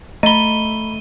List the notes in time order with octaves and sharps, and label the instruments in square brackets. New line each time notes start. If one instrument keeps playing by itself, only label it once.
[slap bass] A3 [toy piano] D#5 [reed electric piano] A#5 B5 [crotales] D#7 G7